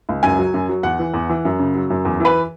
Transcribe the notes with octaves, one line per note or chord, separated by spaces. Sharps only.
C#2
F#2 G#5
F#3
F#2
F#3
E2 F#5
E3
E2
E3
F#2
C#3
F#3
F#2
E2
E3 B4